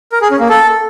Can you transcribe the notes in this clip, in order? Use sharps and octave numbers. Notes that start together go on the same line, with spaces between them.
A#4
G#4
C#4
A#3
A4